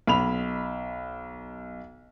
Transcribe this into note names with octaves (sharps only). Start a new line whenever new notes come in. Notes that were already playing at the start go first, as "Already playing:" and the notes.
B1 B5 F7